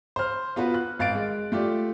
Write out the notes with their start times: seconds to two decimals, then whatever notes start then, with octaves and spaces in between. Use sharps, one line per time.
0.16 C5 F6
0.56 B3 F4 F#4 B4
0.74 F#6
0.99 G#1 F5 A6 D7
1.15 G#3
1.52 A3 F4 G4 D5